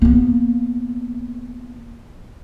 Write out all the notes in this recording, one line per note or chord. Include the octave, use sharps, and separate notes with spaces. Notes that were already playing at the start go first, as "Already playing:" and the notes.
A#3 B3